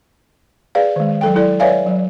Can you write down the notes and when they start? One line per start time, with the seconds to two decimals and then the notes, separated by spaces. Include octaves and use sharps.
0.75 G#4 B4 D5 F5
0.96 D#3 G#3
1.21 F#3 A4 G5
1.35 E4 A4 D5
1.60 B4 C#5 D5 E5 F5 G#5
1.86 F#3